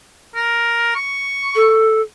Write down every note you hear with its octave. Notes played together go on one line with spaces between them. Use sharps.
A#4
C#6
A4